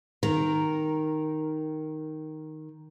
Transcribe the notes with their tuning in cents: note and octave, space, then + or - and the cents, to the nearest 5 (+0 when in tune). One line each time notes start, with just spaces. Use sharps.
D#3 +0 A#4 +0 A#5 +0